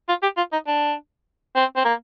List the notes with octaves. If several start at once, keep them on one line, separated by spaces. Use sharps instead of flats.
F4
G4
F4
D#4
D4
C4
C4
A#3